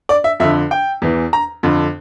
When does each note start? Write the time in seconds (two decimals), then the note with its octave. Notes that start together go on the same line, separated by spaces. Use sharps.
0.09 D5
0.24 E5
0.40 F2 D3 E5
0.71 G5
1.02 E2 E3
1.33 A#5
1.63 F2 D3